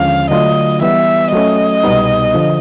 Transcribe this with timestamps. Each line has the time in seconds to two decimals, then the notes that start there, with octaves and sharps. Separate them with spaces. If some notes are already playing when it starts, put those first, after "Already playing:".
Already playing: D#2 D3 F3 G#3 C#4 F5
0.30 D3 F#3 A3 D4 F4 D#5
0.81 E3 G3 B3 E5
1.33 F#3 A3 C#4 D#5
1.84 C2 B2 G3 B3 D#4
2.34 D3 F3